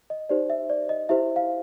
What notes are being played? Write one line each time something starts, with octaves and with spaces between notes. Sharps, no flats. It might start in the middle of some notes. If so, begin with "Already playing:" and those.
D#5
D#4 G4 C5 D5
E5
D5
D#5
E4 G4 C5 E5
F5